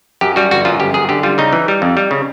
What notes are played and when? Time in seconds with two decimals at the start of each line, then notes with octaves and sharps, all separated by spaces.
0.21 F#2 G4
0.36 G3 F#4
0.51 G1 F#4
0.65 F#2 F4
0.80 G1 G4
0.94 F#2 G#4
1.09 D3 G4
1.23 G3 F4
1.38 C#3 D#4
1.53 E3
1.68 G3
1.82 F2
1.97 G3
2.11 C#3